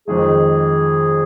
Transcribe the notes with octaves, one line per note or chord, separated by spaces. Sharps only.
F2 D#3 G#3 G#4